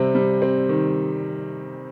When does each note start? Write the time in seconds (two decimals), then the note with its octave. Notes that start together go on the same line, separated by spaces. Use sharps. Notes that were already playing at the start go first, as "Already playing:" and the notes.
Already playing: C3 G3 C4
0.15 G3
0.42 C4
0.69 D#3